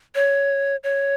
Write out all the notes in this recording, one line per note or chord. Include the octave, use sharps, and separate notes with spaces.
C#5
C#5